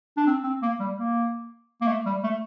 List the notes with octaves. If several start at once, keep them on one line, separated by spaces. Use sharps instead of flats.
D4
C4
C4
A#3
G3
A#3
A#3
A3
G3
A3